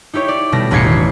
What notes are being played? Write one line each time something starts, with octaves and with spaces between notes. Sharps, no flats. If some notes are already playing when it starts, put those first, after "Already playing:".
D#4 E4 G4 C#5
D5
B2 G3 A3 A#6
E1 A1 B5 G#6 C7 C#7
D#3